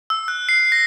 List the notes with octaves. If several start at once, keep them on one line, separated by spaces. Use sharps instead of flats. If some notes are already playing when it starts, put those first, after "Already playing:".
E6
F#6
C7
A#6